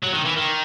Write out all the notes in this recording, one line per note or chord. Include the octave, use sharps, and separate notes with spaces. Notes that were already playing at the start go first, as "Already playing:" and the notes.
F#3
D#3
E3
D#3